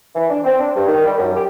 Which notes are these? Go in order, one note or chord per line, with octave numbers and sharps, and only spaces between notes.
E3
D4
C4
D4
G2
D#3
G3
F#2
G4